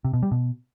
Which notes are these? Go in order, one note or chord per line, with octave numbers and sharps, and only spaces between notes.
C3
B2
G3
B2